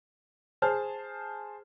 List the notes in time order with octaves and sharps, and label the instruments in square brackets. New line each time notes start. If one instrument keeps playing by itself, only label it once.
[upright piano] G#4 C5 A5 F6